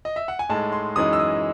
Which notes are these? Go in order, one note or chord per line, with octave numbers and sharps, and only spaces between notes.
D#5
E5
F#5
G#5
A2 G#3 D#4 A5
C6
F#2 E3 G#3 D#4 D#6
E6
D#6